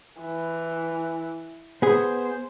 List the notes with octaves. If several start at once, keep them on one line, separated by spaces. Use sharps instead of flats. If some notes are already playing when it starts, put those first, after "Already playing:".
E3
B3 G#4 C5